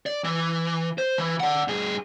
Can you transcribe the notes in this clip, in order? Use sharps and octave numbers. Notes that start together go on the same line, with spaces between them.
D5
E3
C5
E3
D5 F#5
G2 G#4